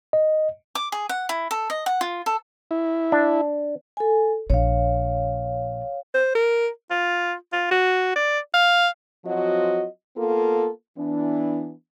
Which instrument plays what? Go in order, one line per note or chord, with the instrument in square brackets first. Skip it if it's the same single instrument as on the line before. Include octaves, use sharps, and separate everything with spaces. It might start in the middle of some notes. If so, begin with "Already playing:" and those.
[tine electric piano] D#5
[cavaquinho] D6
G#4
F#5
E4
A4
D#5
F#5
F4
A4
[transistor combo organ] E4
[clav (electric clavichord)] D4
[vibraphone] A4 G#5
[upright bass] A#1 D4 [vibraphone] C#5 F5
[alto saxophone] C5
A#4
F4
F4
F#4
D5
F5
[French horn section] F3 F#3 C4 F4 F#4 D#5
A#3 B3 F4 A4
E3 B3 D4